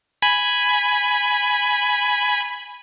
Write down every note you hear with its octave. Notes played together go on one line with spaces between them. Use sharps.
G#5 B5